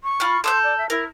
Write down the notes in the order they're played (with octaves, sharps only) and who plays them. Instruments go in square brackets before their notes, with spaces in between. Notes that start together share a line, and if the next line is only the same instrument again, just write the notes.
[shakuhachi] C#6
[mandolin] F4 B5 F6
[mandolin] A4 D#6 G6 [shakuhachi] C6
[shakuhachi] D5
E5
[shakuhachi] E4 [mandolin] A#4